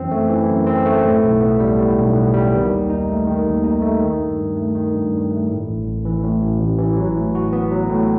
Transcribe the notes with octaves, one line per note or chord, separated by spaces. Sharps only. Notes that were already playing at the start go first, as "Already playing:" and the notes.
Already playing: F#2 E3 C4
A3
E3
F#2
C4
A3
A2
B1
B3
G3
A2
B1
B3
G3
D#3
D#2
D#4
A3
D#3
D#2
D#4
A3
D#3
G2
G2
A3
D#3
G2
G2
A3
A2
A1
A1
E3
A2
A1
A1
E3
F#3
A2
F#4
B3
F#3
A2